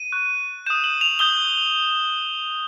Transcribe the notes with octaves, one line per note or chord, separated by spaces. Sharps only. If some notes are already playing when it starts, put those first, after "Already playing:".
Already playing: D#7
C#6 F#6
D#6 G6 E7
F#7
F7
D#6 G6 G7